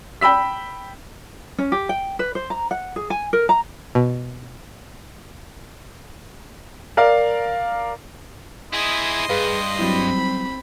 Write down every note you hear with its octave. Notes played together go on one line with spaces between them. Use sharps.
G5 B5 E6 B6
C#4
G4
G5
B4
C5
A#5
F#5
G#4
G#5
A#4
A#5
B2
A#4 D5 F5
E4 G#4 D#5 C6
G2 G#4 B4 F5
F#3 G3 C4 E4 B5